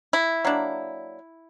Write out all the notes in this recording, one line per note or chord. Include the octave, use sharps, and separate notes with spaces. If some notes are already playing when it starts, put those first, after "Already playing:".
E4
F#3 A#3 D4